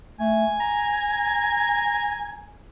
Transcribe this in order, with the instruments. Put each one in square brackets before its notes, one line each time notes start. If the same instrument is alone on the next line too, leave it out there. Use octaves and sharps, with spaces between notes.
[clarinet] A3 [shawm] G#5
[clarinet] A#5